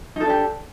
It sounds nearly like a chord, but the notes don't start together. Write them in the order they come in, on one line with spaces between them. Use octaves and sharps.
D#4 A4 D4 G4